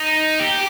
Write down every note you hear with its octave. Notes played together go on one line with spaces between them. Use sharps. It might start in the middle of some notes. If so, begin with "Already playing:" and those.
Already playing: D#4
G4